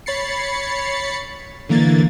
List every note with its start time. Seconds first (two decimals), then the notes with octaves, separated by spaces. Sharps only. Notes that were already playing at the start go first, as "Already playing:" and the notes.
0.06 C#5 B5 A6 C7 C#7
1.69 D3 E3 A#3 G#6 A6